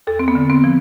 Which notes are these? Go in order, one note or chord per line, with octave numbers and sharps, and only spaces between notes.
E2 A4
C4
B3
D3
C4
F3